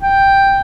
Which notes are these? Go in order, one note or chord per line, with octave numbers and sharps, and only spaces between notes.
G5